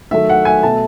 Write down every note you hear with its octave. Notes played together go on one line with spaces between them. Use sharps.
D#3 F#3 A3 E5
F#5
G#5
B2 A3 A5